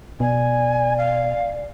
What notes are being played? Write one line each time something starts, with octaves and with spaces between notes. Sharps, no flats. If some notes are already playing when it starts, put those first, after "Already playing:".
B2 D5 G#5
F5